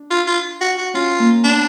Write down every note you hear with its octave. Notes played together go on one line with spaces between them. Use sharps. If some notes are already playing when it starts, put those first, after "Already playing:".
Already playing: D4
F4
F4
F#4
F#4
C#4 F4
A#3
B3 D4